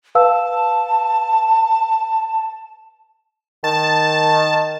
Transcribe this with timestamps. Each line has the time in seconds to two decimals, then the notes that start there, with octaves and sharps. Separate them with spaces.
0.15 B4 F5 A5 E6
3.64 D#3 A5